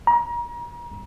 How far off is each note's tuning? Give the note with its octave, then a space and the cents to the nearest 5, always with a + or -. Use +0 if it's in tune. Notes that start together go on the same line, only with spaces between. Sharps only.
A#5 +30